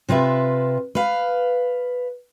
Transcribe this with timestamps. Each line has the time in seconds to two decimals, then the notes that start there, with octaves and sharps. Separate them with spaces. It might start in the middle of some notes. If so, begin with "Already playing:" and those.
0.09 C3 F4 B4 E5
0.95 B4 F5